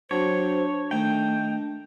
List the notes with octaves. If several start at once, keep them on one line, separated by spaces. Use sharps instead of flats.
F#3 C4 D4 C5 C#5 A5
D#3 A3 D#4 G5